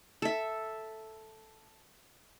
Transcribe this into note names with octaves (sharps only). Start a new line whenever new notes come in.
A4 E5